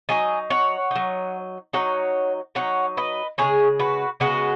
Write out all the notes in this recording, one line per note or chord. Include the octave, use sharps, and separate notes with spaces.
F#3 D#4 D#5 G#5
C#5 F#5
F#3 D#4
F#3 D#4 C#5 F#5
F#3 D#4 C#5 F#5
B4 D#5
C#3 G#3 B3 D#4 G#4 C#5
F#4 B4
C#3 G#3 B3 D#4 F#4 B4